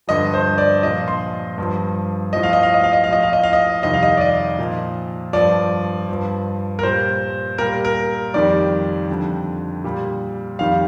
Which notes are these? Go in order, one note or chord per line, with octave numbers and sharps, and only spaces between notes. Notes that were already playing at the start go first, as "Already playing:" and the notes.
G2 D3 F3 D#5
C5
D5
A#2 F3 D#5
C6
G2 F3
A2 F3 D#5
F5
D#5
F5
D#5
F5
D#5
F5
A2 F3 D#5
F5
D#5
F5
D#5
F2 C3 D#3 G3 D#5
F5
D#5
D5
D#5
A#2 F3
G2 F3 D5
G2 F3
A#4
A#2 G3 C5
A#2 G3 A#4
A#4
F2 D#3 G3 D5
F2 D3 G3
A#2 G3
F2 D#3 G3 F5